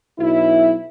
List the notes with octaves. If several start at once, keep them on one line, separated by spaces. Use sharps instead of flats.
B1 E4